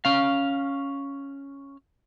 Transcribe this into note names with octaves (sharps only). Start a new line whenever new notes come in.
C#4 F5